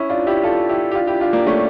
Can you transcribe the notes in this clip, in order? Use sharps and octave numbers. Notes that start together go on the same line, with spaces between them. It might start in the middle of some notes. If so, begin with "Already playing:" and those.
Already playing: C#4 E4
D4 F4
E4 G4
F4 A4
E4 G4
G4
D4 F4
E4 G4
D4 F4
A#3 D4
A3 C#4